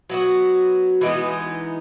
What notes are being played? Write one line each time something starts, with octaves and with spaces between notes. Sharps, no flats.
F#3 B3 F#4
E3 G#3 B3 D#4